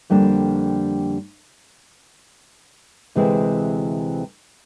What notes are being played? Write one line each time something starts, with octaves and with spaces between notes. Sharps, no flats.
F2 D3 G3 A#3 D4
D2 C3 E3 G#3 C4